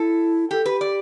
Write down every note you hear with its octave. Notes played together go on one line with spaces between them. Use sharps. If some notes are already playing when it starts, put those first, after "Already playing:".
Already playing: E4 A4
G4 A4
G4 B4
D5